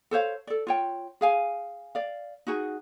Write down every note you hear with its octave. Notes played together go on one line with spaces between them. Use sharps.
A4 C5 C#5 F5
A4 D5
F4 C#5 G5
G#4 F5 G#5
D5 F5
D#4 F#4 G#4